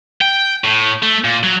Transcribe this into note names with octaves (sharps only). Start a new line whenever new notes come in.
G5
A2
A3
A#2
F#3